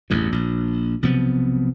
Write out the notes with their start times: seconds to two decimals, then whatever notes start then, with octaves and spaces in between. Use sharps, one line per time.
0.10 A1 E2 G2
0.32 A#1
1.02 B1 C3 F3 B3